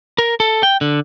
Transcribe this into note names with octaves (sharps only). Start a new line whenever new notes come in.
A#4
A4
G5
D3